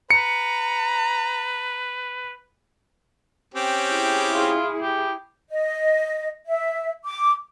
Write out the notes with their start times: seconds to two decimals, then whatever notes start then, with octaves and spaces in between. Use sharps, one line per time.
0.11 B4 A#5 C#7
3.54 C4 C#4 G4
3.88 E4 G#4
4.33 F4
4.82 G4
5.50 D#5
6.46 E5
7.05 D6